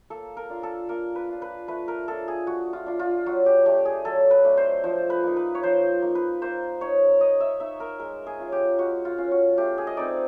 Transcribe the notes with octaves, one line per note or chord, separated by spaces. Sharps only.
A#3 A4
A#4
D4 F4
A4
A#3 A#4
B4
D4 F4
B4
A3 B4
A#4
D4 F4 A4
G#4
A3 F#4
F4
D4 F4
F4
F#3 F#4
G4
A3 D4 G4
G#4
F#3 A4
B4
A3 D4
C5
F3 C5
B4
A#3 D#4
B4
C#5
F3 C5
A#3 D#4
B4
A#3 C5
D#4 C#5
A#3 D#5
E5
D#4 E5
A#4
G#3 A#4
G#4
C#4 F4
G4
G#3 F#4
F4
C#4 F4
F#4
A3 G4
G#4
D#5
C4 D#4 D5